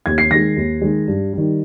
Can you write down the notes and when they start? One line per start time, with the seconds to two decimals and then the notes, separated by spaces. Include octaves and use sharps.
0.06 D#2 G#6
0.18 C7
0.31 D#3 A#6
0.35 G#3
0.56 D#2
0.81 D#3 G#3
1.07 G2
1.33 D#3 G3